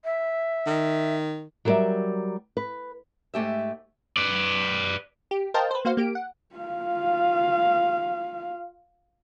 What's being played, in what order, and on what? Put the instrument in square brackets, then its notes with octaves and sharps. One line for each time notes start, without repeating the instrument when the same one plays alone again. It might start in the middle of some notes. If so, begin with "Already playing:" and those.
[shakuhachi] E5
[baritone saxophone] D#3
[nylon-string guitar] F#3 G3 A4 A#4 D5 E5
B4
[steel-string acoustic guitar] G#2 A3 G4 E5
[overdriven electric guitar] B4 D5
[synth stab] G4
A#4 C5 D#5 F5 G5 A5
B4 C5
A#3 F#4 C5 F5
A#3 G4 D7
F#5
[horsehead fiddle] F4 F5